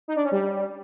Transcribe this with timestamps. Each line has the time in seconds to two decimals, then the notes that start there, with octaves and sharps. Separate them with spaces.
0.08 D#4
0.16 D4
0.24 C#4
0.32 G3